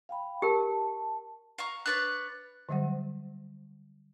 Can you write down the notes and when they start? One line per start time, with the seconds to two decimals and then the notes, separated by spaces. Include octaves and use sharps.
0.09 F5 G5 B5
0.42 G4 A#4 A5
1.58 F5 A#5 C#6
1.86 D4 B4 C#5 F#6 A6
2.69 D3 F#3 G3 C5 F#5